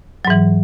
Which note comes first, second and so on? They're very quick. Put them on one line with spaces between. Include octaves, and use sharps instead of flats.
F#3 G#2 E3